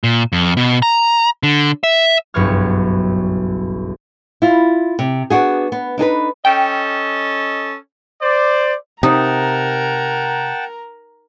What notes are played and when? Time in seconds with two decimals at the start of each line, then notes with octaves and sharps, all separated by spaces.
0.04 A#2
0.32 F2
0.57 B2
0.82 A#5
1.43 D3
1.84 E5
2.34 F#1 B1 G2 B3 C#5 F6
4.42 E4 F4
4.99 C3
5.30 B3 D4 D#4 F#4 G#4
5.72 B3
5.98 D4 D#4 G#4 B4
6.45 C#4 A4 D#5 G5
8.22 C5 D5
9.03 C3 D#4 A#4 F#5 G5 A5 A#5